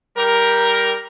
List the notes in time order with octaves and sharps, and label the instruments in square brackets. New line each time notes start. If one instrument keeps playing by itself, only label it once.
[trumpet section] G3 G4 A#4